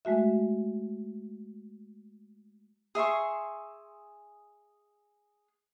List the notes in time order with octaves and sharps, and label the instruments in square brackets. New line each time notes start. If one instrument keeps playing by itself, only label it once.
[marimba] G#3 A3 F#4 E5
[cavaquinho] G#4 E5 C6 C#6